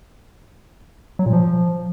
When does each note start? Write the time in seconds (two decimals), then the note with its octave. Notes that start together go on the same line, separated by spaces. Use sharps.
1.19 F#3
1.26 A#2
1.33 F3